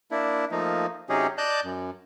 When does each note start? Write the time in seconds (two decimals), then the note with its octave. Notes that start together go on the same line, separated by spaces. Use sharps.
0.11 A#3 D4 E4
0.51 F3 A3 A#3 D#4
1.09 C3 F#3 C#4 D#4 G4 G#4
1.38 D5 D#5 A5 F#6 G6
1.64 F#2